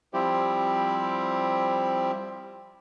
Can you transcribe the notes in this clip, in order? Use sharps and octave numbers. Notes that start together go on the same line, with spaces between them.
F3 G3 C4 E4 G4